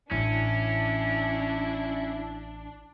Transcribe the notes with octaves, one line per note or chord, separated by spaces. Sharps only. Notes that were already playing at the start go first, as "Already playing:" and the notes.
A1 C#4 D4 E4